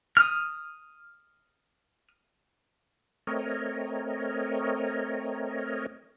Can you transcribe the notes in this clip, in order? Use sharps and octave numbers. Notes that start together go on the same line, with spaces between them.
D#6 F6
A3 C4 A#4 C#5 D#5